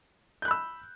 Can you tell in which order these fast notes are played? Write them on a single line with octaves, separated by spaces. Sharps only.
G6 F#6 B5 E6